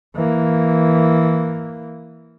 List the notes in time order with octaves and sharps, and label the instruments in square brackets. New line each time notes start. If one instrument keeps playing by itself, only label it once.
[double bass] E3 A#3